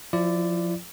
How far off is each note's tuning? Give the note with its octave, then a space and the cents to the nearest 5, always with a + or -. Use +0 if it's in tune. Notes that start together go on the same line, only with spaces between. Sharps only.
F3 +20 E4 +40 D5 +0